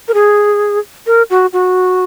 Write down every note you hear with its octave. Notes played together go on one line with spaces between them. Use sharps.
A#4
G#4
A#4
F#4
F#4